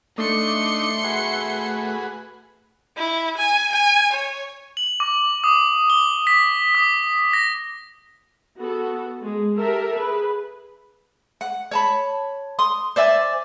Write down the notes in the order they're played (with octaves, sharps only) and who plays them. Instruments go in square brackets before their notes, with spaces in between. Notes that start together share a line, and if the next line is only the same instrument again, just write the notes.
[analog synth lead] A3 [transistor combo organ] D4 D#4 [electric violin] C6 C#7
[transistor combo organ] F#4 G#4 B4
[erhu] E4
G#5
G#5
C#5
[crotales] F#7
D6
D#6
G7
B6
D#6
A#6
[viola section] B3 F#4 A4
G#3
G4 A4 A#4 E5
G#4 B4
[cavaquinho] F#5
C#5 A5 B5
C6 D#6
C5 D5 E5 G#5